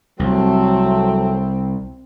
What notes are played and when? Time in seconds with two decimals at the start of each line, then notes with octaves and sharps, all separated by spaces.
0.20 C2 F#3 A3 C4